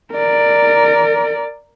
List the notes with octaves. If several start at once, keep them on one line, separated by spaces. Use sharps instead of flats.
A#4 D5